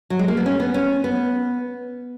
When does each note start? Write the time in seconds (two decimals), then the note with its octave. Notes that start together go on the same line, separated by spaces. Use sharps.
0.10 F#3
0.19 G#3
0.28 A#3
0.37 B3
0.46 C#4
0.60 B3
0.74 C#4
1.04 B3